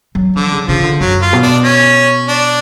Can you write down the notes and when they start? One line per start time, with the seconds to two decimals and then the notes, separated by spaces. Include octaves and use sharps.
0.15 F#3
0.36 D3 F3
0.52 C#3
0.68 C#3 F3
0.83 D3
1.00 F#2 F#3
1.22 F4
1.33 B2
1.43 D4
1.64 C#4
2.28 D4